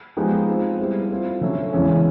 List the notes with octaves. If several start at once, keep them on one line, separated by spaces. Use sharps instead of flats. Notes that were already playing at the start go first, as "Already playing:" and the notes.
F3 G#3 B3 D#4 G4
G#3 C4 F4
G3 B3 E4 G#4 C5
A3 C4 F4
D3 F#3 A3 C#4
E2 C#3 E3 G#3 C#4